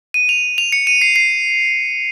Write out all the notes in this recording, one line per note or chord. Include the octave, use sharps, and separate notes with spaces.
D#7
F7
F7
C#7
D#7
C7
C7